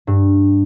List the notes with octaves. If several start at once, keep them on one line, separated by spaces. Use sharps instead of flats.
G2